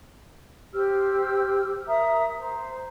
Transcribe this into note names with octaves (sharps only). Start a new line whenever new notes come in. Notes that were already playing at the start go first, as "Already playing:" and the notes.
G4 C5 E6 F6
A#4 E5 A#5 D#6
C5 A#5